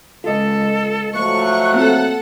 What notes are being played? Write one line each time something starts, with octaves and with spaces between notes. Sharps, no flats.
C#2 F4 A4 D#5
F3 F#3 A3 C#6 F#6
A#3 C4 F4 A4 F#5